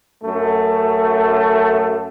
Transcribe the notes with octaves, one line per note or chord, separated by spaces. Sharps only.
F#2 A3